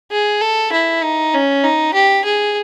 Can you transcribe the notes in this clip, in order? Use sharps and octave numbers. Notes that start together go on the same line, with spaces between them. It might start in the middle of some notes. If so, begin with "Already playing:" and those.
G#4
A4
E4
D#4
C#4
D#4
G4
G#4